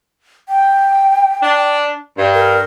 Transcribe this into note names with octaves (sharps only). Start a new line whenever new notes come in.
G5
D4
G2
A#4